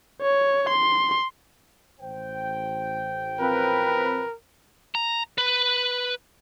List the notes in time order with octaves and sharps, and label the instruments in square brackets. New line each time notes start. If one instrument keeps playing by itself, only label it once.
[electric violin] C#5
C6
[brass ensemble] A1 C5 G5
[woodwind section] F3 C4 B4 [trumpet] A#4
[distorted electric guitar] A#5
B4